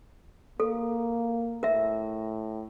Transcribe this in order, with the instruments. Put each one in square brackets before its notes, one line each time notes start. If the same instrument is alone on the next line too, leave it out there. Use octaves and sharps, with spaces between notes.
[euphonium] A#3 [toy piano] A4
[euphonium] A2 [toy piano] A#4 E5